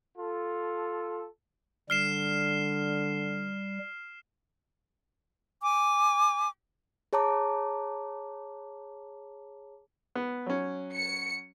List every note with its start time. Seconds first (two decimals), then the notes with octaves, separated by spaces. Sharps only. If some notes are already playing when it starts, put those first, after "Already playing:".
0.18 F4 A4
1.90 D3 G3 F6 C7 E7
5.61 G#5 D6
7.13 G#4 C#5 A5 A#5 D6
10.15 B3
10.46 F#3 C#4
10.95 C#7